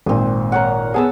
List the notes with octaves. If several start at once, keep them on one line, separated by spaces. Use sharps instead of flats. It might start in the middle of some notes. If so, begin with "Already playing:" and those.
G#1 A#2 C4 D#6
A#4 C#5 F#5
B3 G#4 F#5 A5 E6